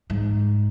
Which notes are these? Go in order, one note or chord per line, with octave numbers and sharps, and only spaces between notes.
G#2